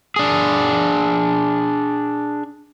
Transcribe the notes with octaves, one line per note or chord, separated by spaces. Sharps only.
D4 G#4